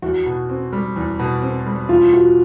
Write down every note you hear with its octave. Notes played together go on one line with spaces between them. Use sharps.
E2 F#4
B2
C4
G3
E2
B2
C4
G3
E2 F4
B2 F#4